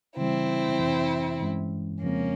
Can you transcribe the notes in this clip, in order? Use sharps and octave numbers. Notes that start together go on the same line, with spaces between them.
C#3 E3 G3 C4 E4
F2 C3 E3
G2 E3 G#3 C#4
F2 C#3 F3 G#3 A#3 C4 C#4